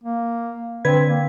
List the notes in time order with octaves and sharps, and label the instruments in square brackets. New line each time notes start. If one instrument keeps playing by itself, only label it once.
[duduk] A#3
[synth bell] D3 B4 G#6 [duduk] C4
[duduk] A#3